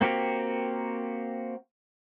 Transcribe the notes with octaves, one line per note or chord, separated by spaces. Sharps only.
A#3 C4 F#4 G4 A#4